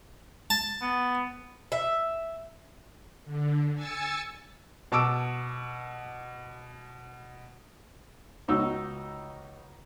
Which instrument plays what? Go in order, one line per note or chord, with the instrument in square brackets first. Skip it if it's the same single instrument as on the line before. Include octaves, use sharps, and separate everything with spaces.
[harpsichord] A5
[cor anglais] B3
[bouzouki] E5
[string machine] D3
G#5 E6 A6 C#7
[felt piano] B2 A5 D6 E6 D7
[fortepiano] C#2 D#4 F#4 E6